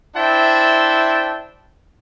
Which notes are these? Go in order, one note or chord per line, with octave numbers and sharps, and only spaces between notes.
D4 E4 C5 E5 G5 A5